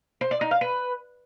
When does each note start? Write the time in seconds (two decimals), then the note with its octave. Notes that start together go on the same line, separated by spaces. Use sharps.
0.21 C5
0.31 D5
0.41 D#4
0.51 F5
0.61 B4